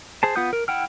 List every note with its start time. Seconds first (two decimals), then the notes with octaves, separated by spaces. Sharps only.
0.23 G#4 C5 A5
0.36 B3 F4 F#5 D#6 G6
0.53 A#4
0.68 E4 F#5 G5 F6